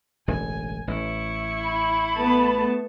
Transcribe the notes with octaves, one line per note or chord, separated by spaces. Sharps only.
E1 A1 D3 G#5
A1 E4 C#6
B5
A3 B3 A5